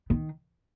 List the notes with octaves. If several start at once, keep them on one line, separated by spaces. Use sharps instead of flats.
D#3